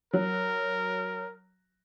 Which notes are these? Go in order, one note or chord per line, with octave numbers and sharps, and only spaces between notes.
F#3 A#4